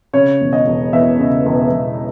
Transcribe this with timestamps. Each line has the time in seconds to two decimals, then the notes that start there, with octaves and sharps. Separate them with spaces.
0.13 C#3 C#5
0.41 E1
0.53 D#5
0.66 E1
0.93 E2 E5
1.19 C#3
1.46 E1
1.71 E1